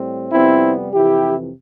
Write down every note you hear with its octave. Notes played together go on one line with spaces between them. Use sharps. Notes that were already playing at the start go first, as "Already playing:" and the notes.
Already playing: A2 G3 C4
F2 C3 G3 B3 C4 E4
F2 C3 E3 E4 G4